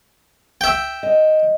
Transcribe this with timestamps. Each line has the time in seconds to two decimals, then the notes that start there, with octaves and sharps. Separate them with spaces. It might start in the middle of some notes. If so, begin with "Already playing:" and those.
0.61 E5 G5
1.03 D#5